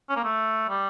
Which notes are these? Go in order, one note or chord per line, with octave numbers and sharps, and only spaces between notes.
C#4
A#3
A3
G3